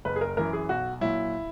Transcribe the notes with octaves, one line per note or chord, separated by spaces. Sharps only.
F#1 B4
G#4
A#4
F#2 E3 A#4
G#4
B1 F#4
A#2 F#3 E4